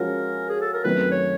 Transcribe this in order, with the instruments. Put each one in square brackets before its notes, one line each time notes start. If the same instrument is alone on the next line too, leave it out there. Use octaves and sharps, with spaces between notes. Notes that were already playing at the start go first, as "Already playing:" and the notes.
Already playing: [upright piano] F3 G#3 C#4 F#4 [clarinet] A#4
[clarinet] G#4
A4
A#4
[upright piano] F#2 D#3 F#3 A3 C4 [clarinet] B4
[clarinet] C#5